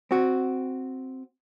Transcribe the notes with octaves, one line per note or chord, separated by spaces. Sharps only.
C4 F#4